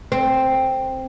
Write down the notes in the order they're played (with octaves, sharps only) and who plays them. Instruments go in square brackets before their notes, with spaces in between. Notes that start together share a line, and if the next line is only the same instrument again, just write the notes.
[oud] C4